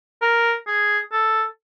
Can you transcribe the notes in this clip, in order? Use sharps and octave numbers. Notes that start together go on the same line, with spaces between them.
A#4
G#4
A4